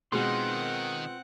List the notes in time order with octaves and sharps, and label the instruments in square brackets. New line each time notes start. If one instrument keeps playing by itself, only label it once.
[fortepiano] B2 G#3 [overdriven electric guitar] D#3 [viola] C4 F#5 [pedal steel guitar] F4 B4 C6